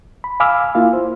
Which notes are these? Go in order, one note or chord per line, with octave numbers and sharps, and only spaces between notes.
B5
F5 G#5 B5 D6 E6 F6
A#3 E4 F4 F5
C5